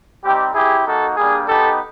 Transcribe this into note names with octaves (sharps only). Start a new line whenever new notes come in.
G3 C4 D#4 G4
C4 E4 G4 G#4
A#3 D#4 F#4 A4
G3 A#3 D4 G#4
B3 D#4 G4 A4